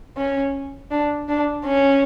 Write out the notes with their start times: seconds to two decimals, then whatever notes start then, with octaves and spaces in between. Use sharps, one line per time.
0.17 C#4
0.91 D4
1.28 D4
1.65 C#4